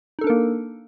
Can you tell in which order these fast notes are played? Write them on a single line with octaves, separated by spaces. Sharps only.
D#4 A4 D4 A#4 A#3